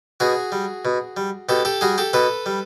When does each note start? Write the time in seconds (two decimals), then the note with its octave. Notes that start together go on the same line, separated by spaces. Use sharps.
0.20 B2 F#4 G#4
0.52 G3
0.85 B2
1.17 G3
1.49 B2 G4 A4
1.65 G4 A4
1.81 G3 F#4 G#4
1.98 G4 A4
2.13 B2 A4 B4
2.46 G3